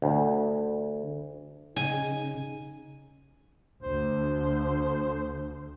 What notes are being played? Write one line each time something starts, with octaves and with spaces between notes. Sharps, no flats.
D2
C#3 D#4 G#5
D2 C5